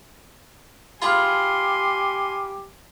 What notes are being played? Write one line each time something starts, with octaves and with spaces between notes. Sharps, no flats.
F4 G4 G#4 G#5 B5 C6 F6